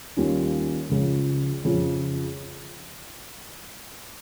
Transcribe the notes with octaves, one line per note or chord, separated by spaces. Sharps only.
D#2 D#3 G3 C#4 F4
C#2 C#3 F3
F2 C#3 F3